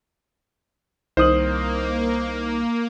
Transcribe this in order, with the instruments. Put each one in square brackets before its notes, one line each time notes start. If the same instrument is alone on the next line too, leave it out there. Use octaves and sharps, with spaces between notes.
[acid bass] C2 [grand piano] D#3 D#6 F#7 [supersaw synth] A#3 [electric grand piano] C5